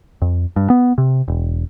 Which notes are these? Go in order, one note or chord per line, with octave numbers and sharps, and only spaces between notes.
F2
G2
B3
C3
E1